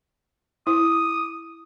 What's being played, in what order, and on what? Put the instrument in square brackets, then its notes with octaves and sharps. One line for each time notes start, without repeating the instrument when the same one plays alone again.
[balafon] E4 [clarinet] D#6